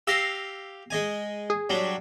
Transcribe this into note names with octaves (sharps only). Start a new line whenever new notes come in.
G4 F5 E6 A#6 C7
G#3 D#5 G#5
G#4
F#3 G3 D4